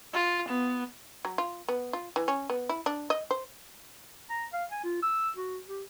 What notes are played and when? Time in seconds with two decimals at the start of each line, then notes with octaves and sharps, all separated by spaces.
0.14 F4
0.48 B3
1.25 F#3
1.38 F4
1.68 B3
1.93 F4
2.16 E3
2.28 C#4
2.50 B3
2.69 E4
2.86 D4
3.10 D#5
3.31 C5
4.30 A#5
4.53 F5
4.72 G#5
4.84 F4
5.02 E6
5.37 F#4
5.68 G4